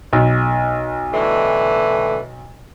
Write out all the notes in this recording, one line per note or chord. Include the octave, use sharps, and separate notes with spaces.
B1
A2 D3 E3